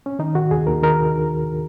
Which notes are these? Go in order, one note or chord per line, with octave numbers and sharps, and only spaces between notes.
C#4
D#3 D#4
D#3 F#4
D#2 G#4
D#2 A#4
D#3 A#4